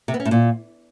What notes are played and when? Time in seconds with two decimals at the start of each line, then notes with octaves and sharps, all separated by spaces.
0.08 C3
0.14 B3
0.20 C#4
0.25 A2
0.31 A#2